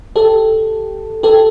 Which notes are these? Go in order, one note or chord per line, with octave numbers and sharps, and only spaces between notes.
G4 A4
G4 A4